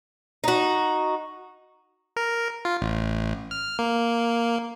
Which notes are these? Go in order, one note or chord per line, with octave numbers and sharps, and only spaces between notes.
D#4 F#4
A#4
F4
A1
F6
A#3